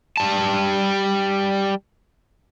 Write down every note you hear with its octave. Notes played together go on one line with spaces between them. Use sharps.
G3 A5